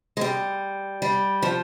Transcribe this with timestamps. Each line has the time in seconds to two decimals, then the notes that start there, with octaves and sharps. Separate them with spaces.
0.17 G#3
0.21 G3
1.02 G3
1.42 F3